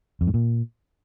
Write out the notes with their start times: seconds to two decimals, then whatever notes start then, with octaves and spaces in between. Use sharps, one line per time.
0.21 F2
0.27 G#2
0.34 A#2